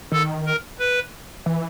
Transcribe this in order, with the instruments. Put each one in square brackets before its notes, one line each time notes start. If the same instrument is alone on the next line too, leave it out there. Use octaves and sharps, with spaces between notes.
[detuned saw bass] D#3 [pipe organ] A4
[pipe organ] A#4
B4
[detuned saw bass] E3